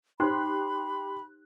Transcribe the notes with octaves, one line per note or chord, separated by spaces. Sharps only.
D#4 G4 C5 B5 C6 F#6